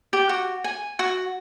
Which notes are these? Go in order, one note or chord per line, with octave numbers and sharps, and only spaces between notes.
G4
F#4
G#5
F#4